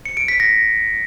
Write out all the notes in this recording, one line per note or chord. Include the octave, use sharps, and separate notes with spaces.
C#7
D7
B6
A#6